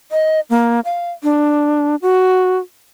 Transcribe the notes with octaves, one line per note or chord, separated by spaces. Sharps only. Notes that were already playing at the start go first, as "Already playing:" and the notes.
D#5
A#3
F5
D4
F#4